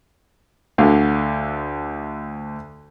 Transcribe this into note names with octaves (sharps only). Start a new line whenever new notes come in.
D2 D3 F5